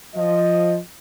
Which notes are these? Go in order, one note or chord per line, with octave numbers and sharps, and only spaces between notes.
F3 D#5